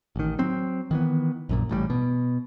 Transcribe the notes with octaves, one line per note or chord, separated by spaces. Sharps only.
A1 D#3
F#3 C4
D#3 E3 B3
A#1 F#2 A#2
A1 A2 F3 G3
B2